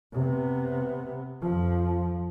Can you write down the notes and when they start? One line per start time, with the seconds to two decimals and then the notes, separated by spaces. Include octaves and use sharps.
0.14 C3 B3
1.42 F2 F3